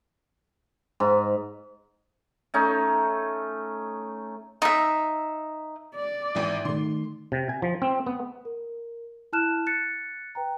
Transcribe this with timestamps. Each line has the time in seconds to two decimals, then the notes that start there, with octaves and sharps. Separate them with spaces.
1.00 G#2
2.54 A3 C#4 D#4
4.62 D#4 E5
5.96 D5
6.35 G#1 E3 E4
6.65 D#3 A3 C6
7.32 C3
7.49 G#5
7.62 F3
7.82 C4
8.07 B3
8.45 A#4
9.33 E4 A5 F6 F#6 E7
9.66 F#6 A6 C#7
10.35 B4 G5 A#5